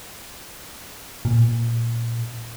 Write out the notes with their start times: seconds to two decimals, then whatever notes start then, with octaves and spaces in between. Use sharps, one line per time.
1.25 A#2